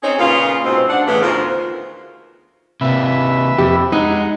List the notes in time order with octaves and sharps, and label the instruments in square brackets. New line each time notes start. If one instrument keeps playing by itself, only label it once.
[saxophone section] C4 C#4 D#4 G#4 C#5
A#2 C#3 B3 F4
G#2 B2 C4
D4 F#5
E2 A2 C#3 E3 B3
D2 D#3 F3 F4 A#4 C5
[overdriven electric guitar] C3 A#3 [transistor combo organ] B4 E5
[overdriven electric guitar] F2 [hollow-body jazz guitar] G4
[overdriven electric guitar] G#3 [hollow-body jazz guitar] D#4 [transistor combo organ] F#5